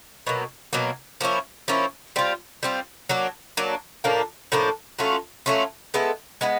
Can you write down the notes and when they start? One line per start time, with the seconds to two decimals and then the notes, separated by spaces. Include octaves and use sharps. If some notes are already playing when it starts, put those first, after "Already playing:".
0.27 B2 F#3 A#3
0.73 B2 F#3 A#3
1.21 F3 A#3 C#4 E4
1.68 F3 A#3 C#4 E4
2.16 G3 C4 F4
2.63 G3 C4 F4
3.09 F#3 A#3 D4
3.57 F#3 A#3 D4
4.04 A2 F3 A#3 D4
4.52 A2 F3 A#3 D4
4.98 F#3 A3 C#4 F4
5.46 F#3 A3 C#4 F4
5.94 G#3 B3 E4 A4
6.41 G#3 B3 E4